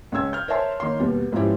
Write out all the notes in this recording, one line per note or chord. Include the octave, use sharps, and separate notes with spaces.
C#2 C#3 C#4 E6 G#6
F6 G6
A#4 C5 C#5 E5 A5 C6
D#3 A#3 C#5 C6
D#2 B2 G3 B3
G#2 F3 B3 C#4 E4 G4